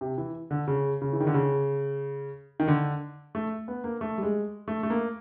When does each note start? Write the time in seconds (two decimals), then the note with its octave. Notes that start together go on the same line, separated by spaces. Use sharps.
0.01 C3
0.18 E3
0.51 D3
0.68 C#3
1.02 C#3
1.13 E3
1.20 D#3
1.27 D3
1.34 C#3
2.60 D#3
2.68 D3
3.35 A3
3.68 B3
3.84 A#3
4.01 A3
4.18 G3
4.23 G#3
4.68 A3
4.83 A3
4.90 A#3